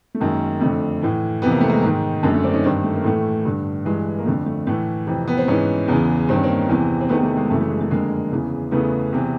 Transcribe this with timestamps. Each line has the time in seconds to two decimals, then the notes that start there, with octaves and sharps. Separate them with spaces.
0.15 A3
0.20 F#2 D#3 G#3 A#3
0.61 F2 D3 A3
1.02 A2 E3
1.42 F2 C3 E3 B3
1.52 A#3
1.61 A3
1.70 G#3 A#3
1.82 G#2 D#3
2.23 F#2 D3 G#3 A#3
2.34 A3
2.43 C4 D4
2.54 C#4 D#4
2.63 G2 D#3 C4 D4
2.84 A3
2.96 A#3
3.04 A2 E3 A3
3.45 G2 D3
3.85 G2 E3 G#3
4.18 A#3
4.26 F2 D3 A3
4.46 A3
4.67 A2 E3 A3
5.07 F2 C3 E3
5.28 B3
5.38 C4
5.48 G#2 E3 B3 C#4
5.88 E2 C#3 E3
6.29 G2 D#3 C4
6.36 C#4
6.43 A#3 C4
6.69 E2 C3 E3
7.01 C4
7.09 E2 C3 D#3 A3 B3
7.23 A3
7.37 G#3
7.50 F#2 C#3 E3 A3
7.61 A3
7.70 G#3
7.80 A3
7.91 F2 D3 G#3 A#3
8.32 E2 C#3 E3
8.71 E2 C#3 E3 A3 B3
9.12 E2 C3 E3